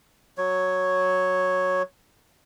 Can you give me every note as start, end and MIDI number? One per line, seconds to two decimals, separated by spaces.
0.38 1.82 54
0.38 1.82 73